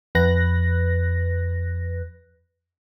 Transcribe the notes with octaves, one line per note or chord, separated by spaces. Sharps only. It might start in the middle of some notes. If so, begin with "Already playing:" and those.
F2 B4 F#6 A#6